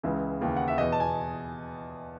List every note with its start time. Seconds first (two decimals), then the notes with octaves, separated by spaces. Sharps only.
0.03 C#2 C#3 E3
0.41 D#2 C#3 E3
0.57 F#5
0.68 E5
0.78 E2 B2 D#5
0.92 A5
1.00 G#5